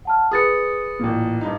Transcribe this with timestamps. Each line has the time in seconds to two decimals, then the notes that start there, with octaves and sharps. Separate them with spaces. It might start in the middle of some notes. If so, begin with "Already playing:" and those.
0.05 F#5 A5 F6
0.31 G#4 B4 D#6 A6 C#7
0.99 A1 A#2
1.41 G2 D#4